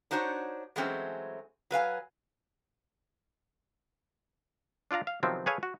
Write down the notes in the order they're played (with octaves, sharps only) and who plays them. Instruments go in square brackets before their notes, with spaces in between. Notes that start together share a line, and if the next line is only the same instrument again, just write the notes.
[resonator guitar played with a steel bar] D4 D#4 F#4 C5 C#5
E3 F#3 G#3 A3 C4 C#4
F#3 B4 F5 G#5
[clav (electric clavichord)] D4 F4 D5 F5 A#5
F5
C3 D#3 F3 F#3 B3 C4
G#4 A4 B4 C#5 F5 G#5
F#4